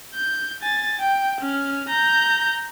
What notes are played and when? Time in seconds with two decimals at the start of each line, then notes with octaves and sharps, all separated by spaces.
0.14 G6
0.61 G#5 A6
1.00 G5
1.41 C#4 F6
1.89 A#5 G6